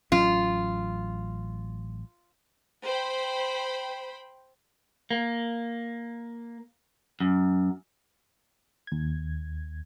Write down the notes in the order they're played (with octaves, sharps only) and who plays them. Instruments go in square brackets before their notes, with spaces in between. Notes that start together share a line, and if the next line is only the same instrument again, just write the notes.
[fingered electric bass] A1 F#3 C#4 [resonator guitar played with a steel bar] F4
[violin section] C5 G5 B5
[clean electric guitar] A#3
F#2
[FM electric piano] D#2 G#6